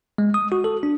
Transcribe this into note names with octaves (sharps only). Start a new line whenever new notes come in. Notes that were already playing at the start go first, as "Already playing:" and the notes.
G#3
D#6
F#4
A4
D4